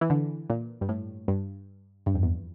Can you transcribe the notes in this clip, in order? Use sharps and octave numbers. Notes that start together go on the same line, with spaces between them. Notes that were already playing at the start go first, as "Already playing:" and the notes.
E3
D3
A#2
G2
A2
G2
G2
F2
E2